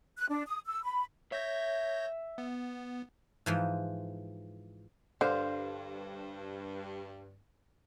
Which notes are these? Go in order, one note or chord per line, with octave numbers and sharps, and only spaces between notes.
F#6
D4
D#6
E6
B5
C#5 E5 G6 A#6
B3
G#2 E3 F3
G2 D3 C5 F5